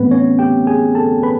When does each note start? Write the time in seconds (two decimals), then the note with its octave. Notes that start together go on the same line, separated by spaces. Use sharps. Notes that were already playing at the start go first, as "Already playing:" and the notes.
Already playing: A2 E3 A3 B3 C4 B4
0.11 C#4 C#5
0.39 G4 G5
0.67 G#4 G#5
0.95 A4 A5
1.23 B4 B5